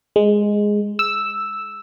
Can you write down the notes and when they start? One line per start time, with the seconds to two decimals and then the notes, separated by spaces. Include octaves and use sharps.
0.16 G#3
0.99 E6